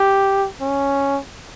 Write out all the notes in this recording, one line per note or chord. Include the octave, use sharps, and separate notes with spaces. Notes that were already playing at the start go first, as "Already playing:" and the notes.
Already playing: G4
C#4